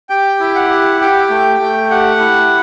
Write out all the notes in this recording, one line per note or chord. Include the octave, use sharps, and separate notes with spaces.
G4 G5
E4
F#5
G4
G4 G5
A3
A3
G4 F#5
E4